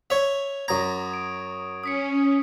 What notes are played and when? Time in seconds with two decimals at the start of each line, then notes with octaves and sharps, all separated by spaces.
0.10 C#5 E5 F7
0.68 F#2 A#5 C#6 D#6 G#6
1.14 D7
1.84 C#4 D#6 B6 C#7